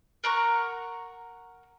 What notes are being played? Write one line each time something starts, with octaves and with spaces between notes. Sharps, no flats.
A#4 F#5 A#5 C#6